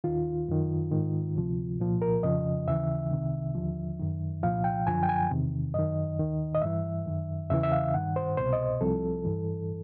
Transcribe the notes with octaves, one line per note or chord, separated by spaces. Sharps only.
D#2 D#3 F4
F#2 D#3
G#2 D#3
D2 C3 F3
C2 A#2 F3
A#4
F2 C#3 F3 D#5
D#2 C#3 E3 E5
C2 C3 D#3
D#2 D3 F3
F#2 D#3
C2 A#2 F3 F5
G5
F#2 D3 F3 G#5
G5
G#5
E2 C3 D#3
F#2 D#3 D#5
D#2 D#3
D#5
G2 E3 E5
F#2 D#3
E2 C#3 E3 E5
E5
F5
G2 D#3 F#5
C5
C2 B2 C5
D#5
C2 C3 F3 A4
G2 E3